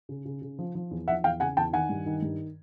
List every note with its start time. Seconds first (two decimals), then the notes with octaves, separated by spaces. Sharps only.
0.09 C#3
0.25 C#3
0.42 C#3
0.59 F3
0.75 F3
0.91 E2
1.08 F3 E5 F#5
1.24 E2 F5 G5
1.40 C#3 F#5 G#5
1.57 E2 G5 A5
1.73 D#3 F#5 G#5
1.90 G2
2.06 D#3
2.22 G2